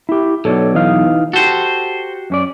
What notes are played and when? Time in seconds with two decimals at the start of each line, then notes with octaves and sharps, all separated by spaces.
0.09 E4 G4
0.45 B1 A4 C#5 D5
0.75 E3 D#4 F5
1.33 F#4 G4 A4 C5
2.30 F#2 C#4 D5